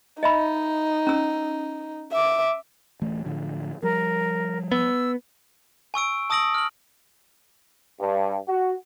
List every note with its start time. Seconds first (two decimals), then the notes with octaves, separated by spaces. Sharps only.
0.23 D#4 D#5 E5 B5
1.07 C#4 E6
2.12 E5 D6
3.01 D1 E3 A3
3.25 A2 D3 F3
3.83 F3 G3 A#4
4.72 B3 E6
5.94 G#5 C#6 E6 D7
6.30 A5 D#6 E6 A#6 D7 F#7
6.55 F6 F#7
8.01 G2
8.49 F#4